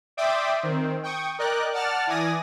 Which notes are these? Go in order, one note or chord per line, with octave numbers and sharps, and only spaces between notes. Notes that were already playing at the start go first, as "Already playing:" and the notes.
D5 E5 G5 C6 D6 D#6
D#3 C4
G5 C#6 D#6
A#4 D5 D#5 G5 F#6
D5 F#5 A5 F6 A6
E3 D5 G#5 D#6 A#6